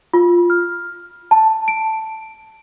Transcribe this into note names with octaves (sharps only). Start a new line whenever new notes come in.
F4
F6
A5
D7